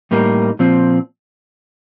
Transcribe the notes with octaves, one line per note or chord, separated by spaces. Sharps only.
A2 G3 A#3 D#4 A#4
A#2 F3 C4